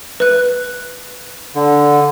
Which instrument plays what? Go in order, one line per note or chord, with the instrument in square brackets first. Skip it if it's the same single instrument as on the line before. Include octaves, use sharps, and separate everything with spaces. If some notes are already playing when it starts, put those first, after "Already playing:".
[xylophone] B4 F#6
[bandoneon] D3